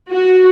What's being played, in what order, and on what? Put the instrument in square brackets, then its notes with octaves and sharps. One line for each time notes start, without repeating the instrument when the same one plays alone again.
[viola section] F#4